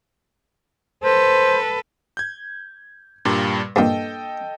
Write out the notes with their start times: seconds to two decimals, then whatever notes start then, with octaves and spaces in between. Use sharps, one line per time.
1.03 A4 B4 C5
2.17 G6 G#6
3.25 G2 A#2 G3
3.76 G2 A#2 A4 D#5 G5